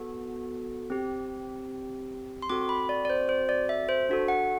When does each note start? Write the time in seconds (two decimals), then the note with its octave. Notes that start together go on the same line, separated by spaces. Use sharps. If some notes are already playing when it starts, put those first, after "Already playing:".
Already playing: B3 F#4 A4
0.90 C4 G4
2.42 C6
2.50 C4 F#4 A4 D6
2.69 B5
2.89 D5
3.05 D5
3.10 C5
3.29 C5
3.49 D5
3.69 E5
3.89 C5
4.09 D4 F#4 A4
4.28 F#5